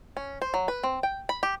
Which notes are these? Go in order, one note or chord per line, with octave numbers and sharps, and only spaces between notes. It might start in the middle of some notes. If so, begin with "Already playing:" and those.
C#4
C5
F#3
B4
C4
G5
B5
G4